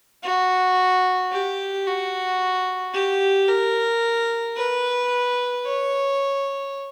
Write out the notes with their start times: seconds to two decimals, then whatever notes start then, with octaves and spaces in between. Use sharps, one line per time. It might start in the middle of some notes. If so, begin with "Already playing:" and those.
0.23 F#4
1.32 G4
1.86 F#4
2.94 G4
3.48 A#4
4.57 B4
5.65 C#5